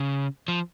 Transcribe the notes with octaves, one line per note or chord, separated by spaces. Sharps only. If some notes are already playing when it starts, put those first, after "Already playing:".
Already playing: C#3
F3